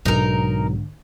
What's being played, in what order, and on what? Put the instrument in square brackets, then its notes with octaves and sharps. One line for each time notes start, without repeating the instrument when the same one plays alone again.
[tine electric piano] B1 [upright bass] G#2 D3 [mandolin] D#4 A#4